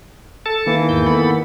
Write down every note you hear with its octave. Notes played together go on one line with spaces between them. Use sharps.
A4 A5
D#3 E3 A#3
E2 G#2 G6
B3 A4 B5